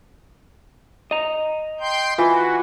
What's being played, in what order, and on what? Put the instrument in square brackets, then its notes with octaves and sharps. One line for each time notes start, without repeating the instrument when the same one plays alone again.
[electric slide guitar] D#5 A#5
[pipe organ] G5 C6 G6
[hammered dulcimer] E3 [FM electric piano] F4 [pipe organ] F#4